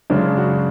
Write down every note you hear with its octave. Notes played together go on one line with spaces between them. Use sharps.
F#2 C#3 G#3 D4
F#4